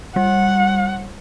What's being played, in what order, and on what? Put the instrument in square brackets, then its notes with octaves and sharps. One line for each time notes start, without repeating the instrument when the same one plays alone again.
[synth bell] G3 [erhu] F#5